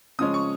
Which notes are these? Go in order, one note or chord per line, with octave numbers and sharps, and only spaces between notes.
C#3 F3 G#3 C#4 D#6
C#6